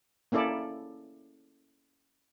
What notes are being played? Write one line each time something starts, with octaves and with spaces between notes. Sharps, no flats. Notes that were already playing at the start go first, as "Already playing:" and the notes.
A#3 C#4 E4 A4 D5